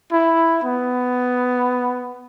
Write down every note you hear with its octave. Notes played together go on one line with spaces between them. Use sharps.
E4
B3